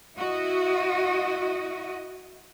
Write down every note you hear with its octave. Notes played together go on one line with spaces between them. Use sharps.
E4 F#4 D#5